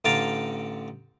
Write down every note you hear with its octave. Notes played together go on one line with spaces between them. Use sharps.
A1 D3 F5 G5 A5 A#5